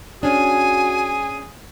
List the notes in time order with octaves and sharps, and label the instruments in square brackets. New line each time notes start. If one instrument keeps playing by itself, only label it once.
[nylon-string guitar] C#4 D4 [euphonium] F#4 [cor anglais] G#4 [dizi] G#5